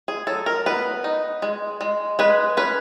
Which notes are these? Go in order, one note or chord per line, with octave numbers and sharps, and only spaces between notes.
G#4
F#3 A4
A#4
B3 B4
D#4
G#3
G#3
G#3 B4
C#4 B4